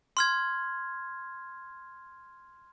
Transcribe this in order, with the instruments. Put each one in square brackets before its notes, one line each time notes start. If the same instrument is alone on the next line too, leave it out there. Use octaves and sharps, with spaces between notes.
[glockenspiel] C6 F6 G#6